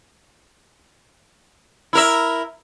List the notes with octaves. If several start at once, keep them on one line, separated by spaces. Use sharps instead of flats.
E4 A#4 E5